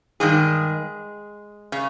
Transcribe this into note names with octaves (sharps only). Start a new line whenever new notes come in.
G2 D#3 G#3 G#4
C#3